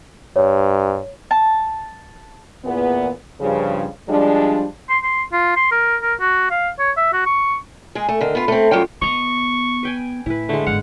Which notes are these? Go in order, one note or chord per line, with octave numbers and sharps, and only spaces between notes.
G2 C#5
A5
E2 A#2 B3
G2 C#3 F3
F3 G3 G#3 D4
C6
C6
F4
C6
A#4
A#4
F#4
F5
C#5
E5
F#4
C#6
G#3 G#4
A3
D3 D#3
B3 F4
A3 C4
G2 F#3 C#4 F4 G5
B3 D#5 A#5 C6 C#6
B4 G5 G#5
A2 E4 B4
D3 G#3 A3
G1 G#2 F5 F#5